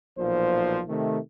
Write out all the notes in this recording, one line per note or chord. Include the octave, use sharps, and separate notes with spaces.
B1 A#2 F3 C5
C3 D#3 A3